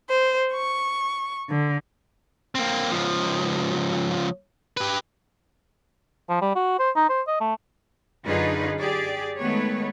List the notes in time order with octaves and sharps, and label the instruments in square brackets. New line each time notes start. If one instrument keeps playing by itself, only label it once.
[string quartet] C5
C#6
D3
[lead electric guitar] A#3 C4
C#2 F3
G4 B4
[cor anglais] F3
G3
F#4
C5
D#4
C5
D#5
A3
[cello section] F#2 D3 D#4 F4 G#4 B4
G4 G#4 D5
D#3 G#3 A3 B3 B4 C#5